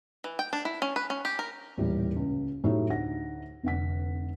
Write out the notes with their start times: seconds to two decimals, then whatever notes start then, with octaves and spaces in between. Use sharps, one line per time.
0.24 E3
0.39 G5
0.53 D4
0.65 E4
0.82 C#4
0.96 B4
1.10 C#4
1.25 G4
1.39 A#4
1.77 D#1 A2 E3 G3
2.16 C#2 C#3
2.64 A2 F#3 A3 D#4 E4 G4
2.89 D2 D#4 F#5 A#6
3.63 F1 D3 F#5 B6